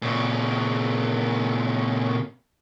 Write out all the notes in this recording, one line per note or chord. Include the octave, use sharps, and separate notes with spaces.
A#2 C#3